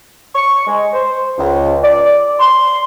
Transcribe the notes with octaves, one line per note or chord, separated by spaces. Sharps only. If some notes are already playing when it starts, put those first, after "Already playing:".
C#6
G#3
C5
C#2
D5
C6